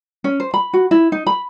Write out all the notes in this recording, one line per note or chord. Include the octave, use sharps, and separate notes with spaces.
C#4
C5
B5
F#4
E4
D#4
B5